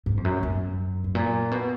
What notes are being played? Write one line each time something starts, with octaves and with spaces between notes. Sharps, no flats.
G#2
F2
F#2
F#2
G#2
A#2
B2